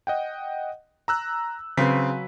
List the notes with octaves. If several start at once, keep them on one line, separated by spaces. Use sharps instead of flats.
D#5 F#5 G5
A#5 E6 F#6
C#3 F#3 C4 B4 B6